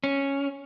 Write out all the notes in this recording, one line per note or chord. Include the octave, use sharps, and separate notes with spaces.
C#4